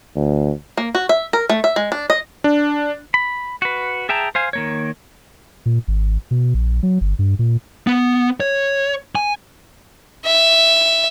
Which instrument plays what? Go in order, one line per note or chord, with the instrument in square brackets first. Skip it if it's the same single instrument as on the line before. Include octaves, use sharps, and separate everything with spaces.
[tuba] D2
[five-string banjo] A#3
F#4
E5
A#4
A3
E5
G#3
D4
D#5
[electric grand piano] D4
[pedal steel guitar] B5
F#4 B4
G#4 E5 G5 A5 A#5
C5 F5 G#5
D#3 A#3 C#5
[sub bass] A#2
G#1
B2
A#1
F#3
G1
G2
A#2
[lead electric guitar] B3
C#5
G#5
[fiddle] E5